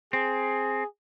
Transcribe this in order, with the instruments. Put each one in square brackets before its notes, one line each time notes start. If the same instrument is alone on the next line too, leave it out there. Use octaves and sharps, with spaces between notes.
[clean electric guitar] C4 [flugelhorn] G#4